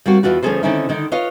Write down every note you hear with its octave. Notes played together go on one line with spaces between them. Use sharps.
G3 A#3 C4 F#4
E2 A2 E3 F4 F#4 B4
D2 F3 C#4 G#4 A4 C5
D3 D#3 C4 C#4 D#4 E4
D3 D#3 D#4
F4 B4 C#5 D#5 F5